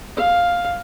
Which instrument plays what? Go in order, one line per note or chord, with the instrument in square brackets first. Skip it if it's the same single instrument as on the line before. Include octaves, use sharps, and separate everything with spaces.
[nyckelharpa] F5